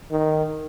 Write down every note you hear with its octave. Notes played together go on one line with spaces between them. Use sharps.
D#3